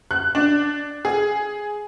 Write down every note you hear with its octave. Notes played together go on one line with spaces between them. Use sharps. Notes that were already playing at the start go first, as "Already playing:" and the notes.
F#6
D4
G#4